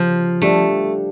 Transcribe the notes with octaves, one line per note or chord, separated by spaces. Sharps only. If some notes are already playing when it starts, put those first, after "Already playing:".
Already playing: C#3 F3 G3
G3 A3 D4